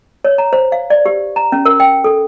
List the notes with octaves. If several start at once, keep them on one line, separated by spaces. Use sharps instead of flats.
C#5
A#5
C5
F5
D5
G4
A#5
C#4
A#4
G5
A4